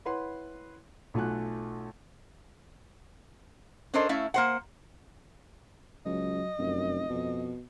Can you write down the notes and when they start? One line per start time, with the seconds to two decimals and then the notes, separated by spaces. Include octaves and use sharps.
0.05 E4 B4 C#5 F#5 C6
1.14 B1 A3 F4 F#4 G#5 F#6
3.94 C#4 D4 A4 A#4 C5 D#5
4.09 A3 C#4 E4 E5 F5
4.34 A#3 C5 F#5
6.06 C#2 F#3 D#5
6.59 F1 F#2
7.10 F2 B2